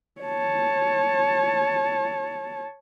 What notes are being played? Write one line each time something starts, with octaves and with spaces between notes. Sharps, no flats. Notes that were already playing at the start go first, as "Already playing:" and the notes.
C#5 A5